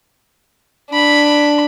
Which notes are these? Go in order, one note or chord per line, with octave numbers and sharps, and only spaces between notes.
D4 B5